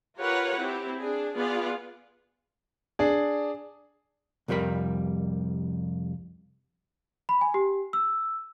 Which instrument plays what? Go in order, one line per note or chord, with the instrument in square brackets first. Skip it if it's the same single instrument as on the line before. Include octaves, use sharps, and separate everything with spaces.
[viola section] F4 G4 A#4 B4 C#5 F#5
C4 E4 G4
D4 G#4
B3 F4 G#4 D5
[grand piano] D4 G#4
[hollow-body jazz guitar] C2 F2 G3 A#4 B5
[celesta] B5
G#5
G4
E6